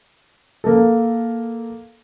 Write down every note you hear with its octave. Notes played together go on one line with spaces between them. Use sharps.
A#3 A4